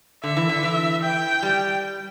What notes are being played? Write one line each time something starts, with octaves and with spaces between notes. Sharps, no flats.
D3 E5
E3
D3
E3
G5
G3